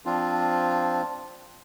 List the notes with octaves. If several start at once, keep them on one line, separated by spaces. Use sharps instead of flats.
F3 C4 D4 F4